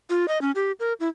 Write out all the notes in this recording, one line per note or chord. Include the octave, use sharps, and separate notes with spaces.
F4
D#5
C#4
G4
A#4
E4